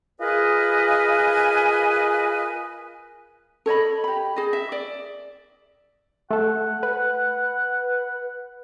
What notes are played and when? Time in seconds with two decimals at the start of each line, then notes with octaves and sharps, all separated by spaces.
0.20 F4 G#4 A#4 B4 D#5 G#5
3.66 A4 C#5 D#5 B5
4.04 G4 B5
4.36 G#4 D#5
4.53 E5
4.72 D5
6.31 A3 A4 F#5
6.83 B4